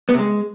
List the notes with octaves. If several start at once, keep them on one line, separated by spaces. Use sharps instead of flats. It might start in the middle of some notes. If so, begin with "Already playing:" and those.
B3
C3
G#3